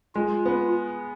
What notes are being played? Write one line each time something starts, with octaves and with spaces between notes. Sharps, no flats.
G#3 F4
B3